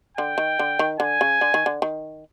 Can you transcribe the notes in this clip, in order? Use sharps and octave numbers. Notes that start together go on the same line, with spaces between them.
D3 G5
D#3
D3
D#3
D3 G#5
C#3
D3
D#3
D3
D#3